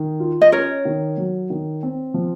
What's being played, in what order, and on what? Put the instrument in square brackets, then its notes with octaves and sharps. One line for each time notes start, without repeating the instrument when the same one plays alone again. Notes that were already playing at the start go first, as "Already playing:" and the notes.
Already playing: [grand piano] D#3
F4
[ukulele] D#5
[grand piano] C#4 [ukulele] A#4 C#5
[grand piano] D#3
F#3
D#3
C4
F3